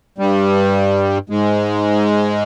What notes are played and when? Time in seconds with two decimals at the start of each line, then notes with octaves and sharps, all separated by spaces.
0.18 G2 G3
1.29 G#2 G#3